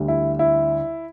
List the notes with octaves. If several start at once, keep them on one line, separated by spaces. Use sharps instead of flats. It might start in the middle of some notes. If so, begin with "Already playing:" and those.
Already playing: D2 D3 G3
E4
E4